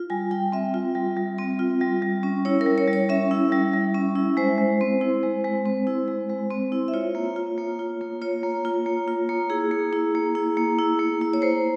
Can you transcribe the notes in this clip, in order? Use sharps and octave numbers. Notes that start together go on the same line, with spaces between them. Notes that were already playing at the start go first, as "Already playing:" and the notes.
Already playing: F4
G3 G#5
G3 G5
C4 E5
F4
G3
G3
C4
F4
G3
G3
C#4
E4 C#5
A#4
G3
C#5
G3
C#5
C#4 E5
E4
G3
G3
C#4
E4
G#3 C5
G#3
C4
E4
G#3
G#3
C4
E4
G#3
G#3
C4
E4
E5
F4 C#5
A#3
F4
A#3
F4
A#3
F4 C#5
A#3
F4
A#3
F4
A#3
E4 G#4
A#3
E4
A#3
E4
A#3
E4
A#3
E4
C#5
A#3 C5